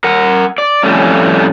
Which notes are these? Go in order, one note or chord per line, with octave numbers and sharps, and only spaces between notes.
A#4 F#5
D5
F2 A2 G3 A3 C#4